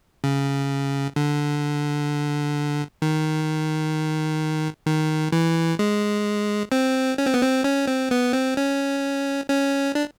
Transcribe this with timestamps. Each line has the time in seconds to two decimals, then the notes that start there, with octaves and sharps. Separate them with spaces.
0.24 C#3
1.16 D3
3.02 D#3
4.86 D#3
5.32 E3
5.79 G#3
6.72 C4
7.18 C#4
7.26 C4
7.34 B3
7.41 C4
7.64 C#4
7.88 C4
8.11 B3
8.33 C4
8.57 C#4
9.49 C#4
9.95 D4